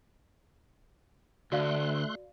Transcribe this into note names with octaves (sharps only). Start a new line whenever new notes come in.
D2 A3 F#4 D5 F5 C6 F#6